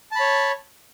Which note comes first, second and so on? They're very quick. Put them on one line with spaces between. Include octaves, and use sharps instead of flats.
A5 B5 C#5